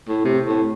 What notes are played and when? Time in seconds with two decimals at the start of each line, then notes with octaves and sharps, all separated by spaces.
0.08 A2
0.24 C3
0.46 A2